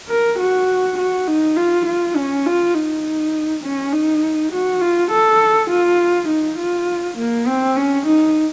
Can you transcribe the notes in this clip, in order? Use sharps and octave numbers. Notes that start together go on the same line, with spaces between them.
A#4
F#4
F#4
D#4
F4
F4
C#4
F4
D#4
C#4
D#4
F#4
F4
A4
F4
D#4
F4
A#3
C4
C#4
D#4